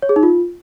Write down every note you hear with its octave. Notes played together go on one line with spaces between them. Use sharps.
C#5
G#4
D#4
F4